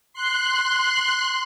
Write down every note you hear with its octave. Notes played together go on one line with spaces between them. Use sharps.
C6 F#6